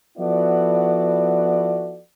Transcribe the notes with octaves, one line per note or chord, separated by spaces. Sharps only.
F3 B3 E4 F#4 A4 D5